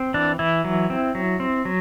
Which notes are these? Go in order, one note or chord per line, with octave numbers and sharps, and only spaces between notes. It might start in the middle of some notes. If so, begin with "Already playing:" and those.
Already playing: C4
E3 D4
E3 E4
F#3
C4
F#3
C4
F#3